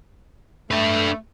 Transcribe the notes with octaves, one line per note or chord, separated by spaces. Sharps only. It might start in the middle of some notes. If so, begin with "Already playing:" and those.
A3 D4 B4